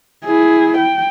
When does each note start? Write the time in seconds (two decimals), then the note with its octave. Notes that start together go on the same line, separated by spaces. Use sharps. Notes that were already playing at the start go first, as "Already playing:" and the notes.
0.25 E4 G#4
0.77 G5